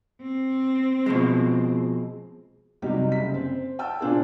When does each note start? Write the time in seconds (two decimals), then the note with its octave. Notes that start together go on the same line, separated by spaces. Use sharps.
0.22 C4
1.06 B2 F3 G#3
2.82 C3 F#3 G3 D#4 G4
3.12 F#1 B6
3.34 C4
3.79 G5 A5 E6
4.00 A#2 C4 D4 F4 G#4